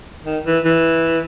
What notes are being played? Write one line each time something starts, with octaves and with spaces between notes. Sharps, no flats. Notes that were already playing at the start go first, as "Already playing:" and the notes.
D#3
E3
E3